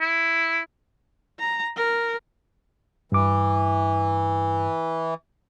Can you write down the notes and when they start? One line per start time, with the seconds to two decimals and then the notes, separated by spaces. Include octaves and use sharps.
0.01 E4
1.39 A#5
1.77 A#4
3.12 G2 E3 D6